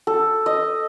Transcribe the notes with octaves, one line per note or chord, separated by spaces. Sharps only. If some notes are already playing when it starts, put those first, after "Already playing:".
A4
D#5